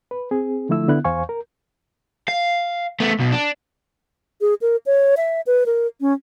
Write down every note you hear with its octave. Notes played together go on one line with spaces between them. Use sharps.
B4
C4 G#4
D3 F3 A3 E4 E6
D3 B3 E4 F#6
E2 C5 F5 G#5 C#6
A#4
F5
A3 B3
B1 B2
D4
G#4
A#4
C#5
E5
B4
A#4
C#4